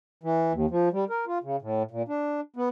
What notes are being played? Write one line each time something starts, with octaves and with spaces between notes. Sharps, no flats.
E3
D#2
F3
G3
A#4
F4
C#3
A2
A#2
D4
B3